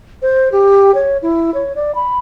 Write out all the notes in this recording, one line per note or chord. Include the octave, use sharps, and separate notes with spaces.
C5
G4
C#5
E4
C#5
D5
B5